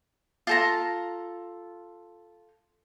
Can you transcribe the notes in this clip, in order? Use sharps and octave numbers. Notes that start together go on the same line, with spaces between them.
F4 A4 A#5